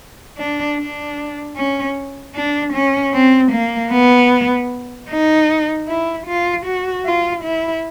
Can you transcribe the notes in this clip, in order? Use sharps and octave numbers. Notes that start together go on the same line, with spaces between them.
D4
D4
C#4
D4
C#4
C4
A#3
B3
D#4
E4
F4
F#4
F4
E4